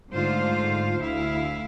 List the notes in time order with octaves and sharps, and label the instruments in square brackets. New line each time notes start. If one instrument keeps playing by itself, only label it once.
[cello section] G#2 D3 A3 F4 C5 F5
D2 E4 F5